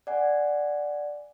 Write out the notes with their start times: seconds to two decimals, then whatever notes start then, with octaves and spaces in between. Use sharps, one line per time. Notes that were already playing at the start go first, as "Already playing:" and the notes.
0.07 D5 F#5 G#5